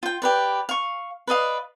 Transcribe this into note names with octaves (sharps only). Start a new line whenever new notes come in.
F4 G5
G4 B4 D5
F5 C#6
B4 D5 D#5 F5